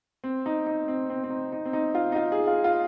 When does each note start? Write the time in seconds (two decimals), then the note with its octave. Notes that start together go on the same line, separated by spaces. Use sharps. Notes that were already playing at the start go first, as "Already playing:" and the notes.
0.24 C4
0.46 D#4
0.67 D#4
0.88 C4
1.10 C4
1.24 C4
1.30 D#4
1.52 D#4
1.65 C4
1.73 D#4
1.95 F4
2.12 D#4
2.16 F4
2.32 G#4
2.47 F4
2.64 F4